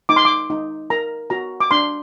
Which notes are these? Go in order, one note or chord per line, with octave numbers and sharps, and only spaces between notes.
D#4 D6
C6
D6
D#4
A#4 A#5
F#4 A#5
D6
D4 C6